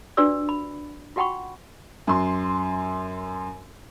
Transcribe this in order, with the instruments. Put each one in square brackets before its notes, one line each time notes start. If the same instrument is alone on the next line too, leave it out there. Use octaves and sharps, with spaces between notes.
[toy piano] D4 F4 F#4 B4 D5 E6
B5
F4 F#4 F#5 G5 B5 C#6
[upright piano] F#2 C6